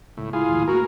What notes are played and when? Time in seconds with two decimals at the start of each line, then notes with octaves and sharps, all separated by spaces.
0.17 C#2 A2
0.33 E4 F4 G#4
0.48 A#1 D#2 A2
0.68 A3 A#3 C#4 F#4 A#4